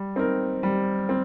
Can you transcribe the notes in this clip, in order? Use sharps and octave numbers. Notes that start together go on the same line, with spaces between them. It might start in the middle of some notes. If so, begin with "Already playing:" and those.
Already playing: G3
C4 D#4 A#4
G3
C4